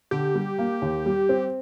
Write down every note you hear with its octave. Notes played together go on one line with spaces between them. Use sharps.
D3 G4
G3
A#3
D#2
G3
C4